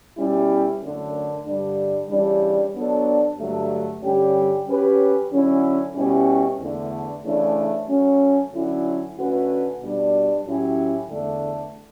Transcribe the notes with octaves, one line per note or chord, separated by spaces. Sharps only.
B2 G3 C#4 E4
F#2 D3 A3
G2 D3 G3 D4
C#3 E3 G3 D4
F#3 B3 D4 A4
G2 D3 F#3 A3
G2 D3 G3 C#4 G4
F#3 C#4 G4 B4
D3 F#3 C#4 E4
B2 G3 C#4 E4 G4
E2 D3 A3
C#3 E3 A3 D4
F#3 A3 C#4
D3 F#3 C#4 E4
D3 A3 C#4 F#4 B4
B2 G3 D4
A2 F#3 C#4 E4 G4
E2 D3 A3 D4 A4